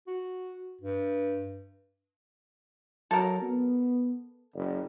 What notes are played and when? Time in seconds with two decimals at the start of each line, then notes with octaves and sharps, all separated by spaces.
0.07 F#4
0.81 G2
3.11 F#3 A4 A#4
3.42 B3
4.55 F#1